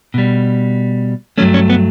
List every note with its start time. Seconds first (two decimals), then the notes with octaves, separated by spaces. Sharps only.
0.14 B2 G3
1.38 G2 F#3 A3 C#4
1.54 C#4
1.70 B3